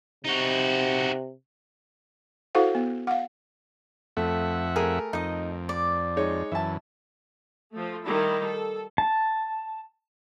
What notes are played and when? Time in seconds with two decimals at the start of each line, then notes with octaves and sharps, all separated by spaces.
0.24 C3 D#4 F#4
2.55 E4 F#4 A4 C5 F5 F#5
2.75 B3
3.07 F5 F#5
4.17 F2 A3 E5 F#5
4.76 A3 G#4 A#4
5.13 F2 D#4 D#5
5.69 D5
6.17 G#3 D#4 C#5
6.52 F#2 E3 E5 A5
7.73 F3 A3
8.04 D#3 G3 E4
8.43 A4
8.98 A5